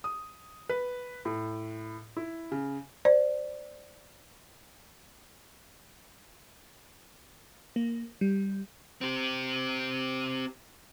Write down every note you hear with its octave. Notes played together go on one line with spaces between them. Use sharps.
D#6
B4
A2
E4
C#3
C5 D5
A#3
G3
C4 G4